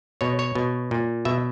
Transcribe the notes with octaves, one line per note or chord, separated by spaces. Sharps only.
B2 C#5
C#5
B2
A#2
B2 E5